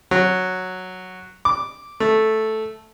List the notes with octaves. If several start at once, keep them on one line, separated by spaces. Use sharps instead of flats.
F#3
D6
A3